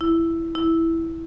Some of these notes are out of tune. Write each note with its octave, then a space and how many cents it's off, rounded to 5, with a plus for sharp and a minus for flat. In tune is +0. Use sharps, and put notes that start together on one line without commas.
E4 +5
E4 -5